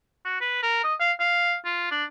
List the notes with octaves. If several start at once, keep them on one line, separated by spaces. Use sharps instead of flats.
F#4
B4
A#4
D#5
F5
F5
F4
D4